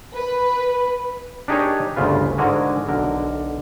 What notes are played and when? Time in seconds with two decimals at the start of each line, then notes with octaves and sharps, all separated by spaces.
0.14 B4
1.48 D4 D#4 G4 G#4 A#4 C#5
1.96 G1 D2 C#3 F4 B4
2.38 G#2 D3 F#4 A#4 G#5
2.89 B1 D3 A#4